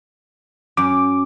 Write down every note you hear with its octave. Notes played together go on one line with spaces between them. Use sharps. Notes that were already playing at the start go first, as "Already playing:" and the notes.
F#2 D6